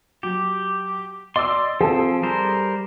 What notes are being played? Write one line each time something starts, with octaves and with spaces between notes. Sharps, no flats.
F#3 G4
D5 D#5 C6 D6 E6
F3 C4 G#4 A4
G3 A#4 C5